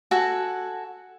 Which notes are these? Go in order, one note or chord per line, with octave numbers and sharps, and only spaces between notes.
F#4 A4 F#5 G#5